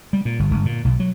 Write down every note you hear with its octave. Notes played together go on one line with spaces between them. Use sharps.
G3
A#2
G1
G1
A#2
B1
F#3